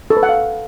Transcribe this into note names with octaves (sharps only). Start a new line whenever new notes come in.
A4
B4
F#5
F5